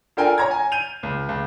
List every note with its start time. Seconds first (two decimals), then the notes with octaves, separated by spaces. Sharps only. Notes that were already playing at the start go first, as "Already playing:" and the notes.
0.17 D4 F4 A4 A#4 G5 G#5
0.38 C#5 A#5 G#6
0.51 G#5
0.72 G6 D#7 F7
1.03 C#2
1.29 C#2